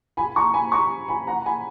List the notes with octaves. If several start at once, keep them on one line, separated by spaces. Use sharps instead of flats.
G#5 B5
A#5 C#6
G#5 B5
A#5 C#6
G#5 B5
F#5 A#5
G#5 B5